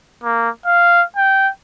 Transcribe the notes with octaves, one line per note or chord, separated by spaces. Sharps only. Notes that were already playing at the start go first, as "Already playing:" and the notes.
A#3
F5
G5